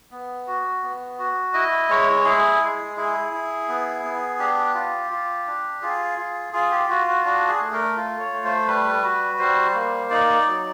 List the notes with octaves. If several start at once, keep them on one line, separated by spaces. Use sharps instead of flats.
B3
F#4
B3
F#4
E4 D#5
G#3 C#5
E4 G#4
G#3
E4 G#4
E4
B3
B3
D4 G4
F4
F4
D4
F4 G#4
F4
F4 G#4
G4
F4 F#4
F#4
D4 F#4
G#4
A3
A#4
F4
C#5
A3
C5
G3 B4
F#4
G3 C5
A#3
D#4 D5
F#3